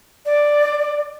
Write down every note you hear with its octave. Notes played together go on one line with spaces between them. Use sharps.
D5